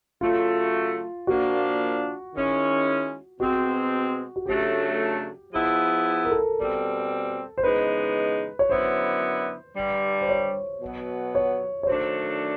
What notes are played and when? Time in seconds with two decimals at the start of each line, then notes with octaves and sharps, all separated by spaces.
0.21 C#3 F#3 A3 F4
1.27 A#2 F3 A#3 D4 F4 F#4
2.33 D#3 G#3 C#4 E4
3.40 B2 G#3 C4 F#4
4.36 F#4
4.46 C#3 F#3 A3 D4 G4
5.51 F3 G#3 B3 E4
6.25 A#4
6.31 A4
6.58 B2 G3 C4
7.58 C5
7.63 C#3 E3 G#3 B3 D#4 B4
8.59 C#5
8.70 F#2 D3 F#3 B3 E4 C5
9.75 G2 D3 G3
10.21 C5
10.29 C#5
10.81 B2 F#3 B3
11.35 C#5
11.83 C#5
11.87 D#3 F#3 A3 D4 C5